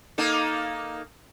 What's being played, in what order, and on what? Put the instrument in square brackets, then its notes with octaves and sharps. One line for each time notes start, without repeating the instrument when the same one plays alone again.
[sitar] A#3 D#4 A4